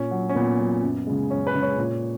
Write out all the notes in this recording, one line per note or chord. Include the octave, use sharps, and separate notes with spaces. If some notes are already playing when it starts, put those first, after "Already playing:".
Already playing: A#2 C#4
F#3
C#4
A#2 B3
F#3
F#2
C#3 G#3
F#2 C#4
B4
C#3 G#3
C#5
A#2